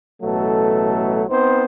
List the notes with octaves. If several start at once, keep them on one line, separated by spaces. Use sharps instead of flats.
A1 B2 F#3 A3 A4
B3 C4 D#4 C5